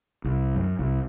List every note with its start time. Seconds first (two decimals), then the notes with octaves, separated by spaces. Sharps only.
0.24 C2
0.56 F#2
0.79 C2